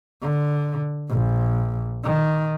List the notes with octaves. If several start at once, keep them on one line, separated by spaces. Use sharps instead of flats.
D3
A#1
D#3